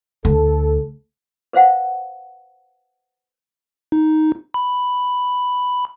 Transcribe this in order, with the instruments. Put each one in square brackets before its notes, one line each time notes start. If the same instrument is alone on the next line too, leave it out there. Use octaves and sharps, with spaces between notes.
[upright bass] D2 [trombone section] A4
[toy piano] B4 C5 F5 F#5
[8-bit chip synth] D#4
B5